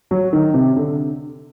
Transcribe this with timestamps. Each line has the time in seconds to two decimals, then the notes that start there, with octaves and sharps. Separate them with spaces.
0.11 F#3
0.33 D#3
0.54 C3
0.76 D3